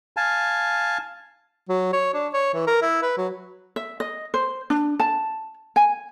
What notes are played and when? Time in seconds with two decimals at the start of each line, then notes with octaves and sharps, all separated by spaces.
0.17 F5 G#5 A5
1.69 F#3
1.93 C#5
2.14 D4
2.34 C#5
2.54 E3
2.67 A#4
2.82 E4
3.02 B4
3.18 F#3
3.76 E5
4.00 D#5
4.34 C5
4.70 D4
5.00 A5
5.76 G#5